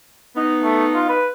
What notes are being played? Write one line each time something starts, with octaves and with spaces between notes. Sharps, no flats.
B3 D#4
A3
F4
B4